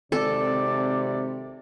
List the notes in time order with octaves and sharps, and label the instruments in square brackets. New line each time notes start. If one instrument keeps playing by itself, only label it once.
[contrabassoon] G#1 [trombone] C3 [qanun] A4 [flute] D5